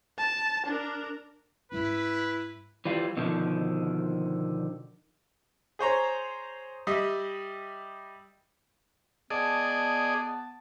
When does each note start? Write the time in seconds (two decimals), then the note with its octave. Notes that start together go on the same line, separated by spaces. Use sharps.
0.18 A5
0.66 D4 A#4
1.72 G#2 G3 C#4 E4 B4
2.85 E3 G3 F4
3.17 B2 D3 D#3 F3
5.79 G#4 C5 C#5 A#5
6.87 G3 D#5 E5
9.30 B3 G#4 D5 D#5 A5